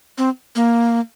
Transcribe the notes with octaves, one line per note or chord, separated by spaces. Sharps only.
C4
A#3